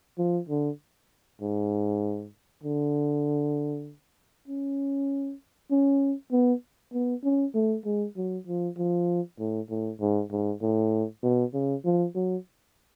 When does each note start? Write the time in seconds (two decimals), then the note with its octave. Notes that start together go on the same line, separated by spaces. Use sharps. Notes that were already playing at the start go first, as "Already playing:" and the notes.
0.18 F3
0.49 D3
1.41 G#2
2.64 D3
4.48 C#4
5.71 C#4
6.32 B3
6.93 B3
7.24 C#4
7.55 A3
7.85 G#3
8.16 F#3
8.47 F3
8.78 F3
9.39 A2
9.70 A2
10.01 G#2
10.31 G#2
10.62 A2
11.23 B2
11.54 C#3
11.85 F3
12.15 F#3